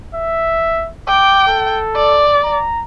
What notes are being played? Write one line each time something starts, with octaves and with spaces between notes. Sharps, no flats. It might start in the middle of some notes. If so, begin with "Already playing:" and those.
E5
G5 D6
A4
D5
A#5